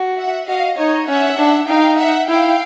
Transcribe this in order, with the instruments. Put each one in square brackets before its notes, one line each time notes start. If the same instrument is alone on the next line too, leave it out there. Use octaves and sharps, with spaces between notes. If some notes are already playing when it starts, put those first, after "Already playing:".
Already playing: [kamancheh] F#4
[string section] E5 F#5
[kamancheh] F#4 [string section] D#5 F5
[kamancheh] D#4 [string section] C#5 D#5
[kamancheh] C#4 [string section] E5 F#5
[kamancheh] D4
[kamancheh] D#4 [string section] F5 G5
[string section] E5 F#5
[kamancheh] E4 [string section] F5 G5